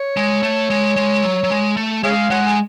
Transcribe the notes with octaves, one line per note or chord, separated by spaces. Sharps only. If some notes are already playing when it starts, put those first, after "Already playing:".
Already playing: C#5
G#3
A3
G#3
G#3
F#3
F#3
G#3
A3
G#3 G#4 C#5 F5
G#3 C#5 F#5
G#5